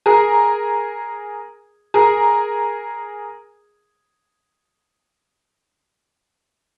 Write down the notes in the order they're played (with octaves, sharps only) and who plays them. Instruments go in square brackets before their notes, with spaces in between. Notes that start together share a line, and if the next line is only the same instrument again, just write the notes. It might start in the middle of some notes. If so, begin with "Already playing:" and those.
[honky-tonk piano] G#4 A#4
G#4 A#4